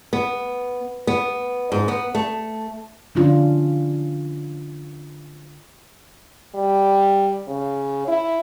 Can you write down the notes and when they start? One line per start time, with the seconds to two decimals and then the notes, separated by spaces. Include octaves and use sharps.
0.13 B3
1.07 B3
1.72 G#2
1.88 B3
2.15 A3
3.15 D3 C#4 D4 F4
6.55 G3
7.47 C#3
8.08 E4